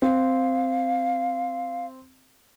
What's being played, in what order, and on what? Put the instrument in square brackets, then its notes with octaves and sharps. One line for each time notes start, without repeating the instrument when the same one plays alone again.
[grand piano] C4 [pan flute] F5